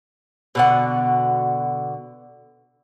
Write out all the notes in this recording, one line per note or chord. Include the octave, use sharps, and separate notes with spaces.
B2 D3 F#5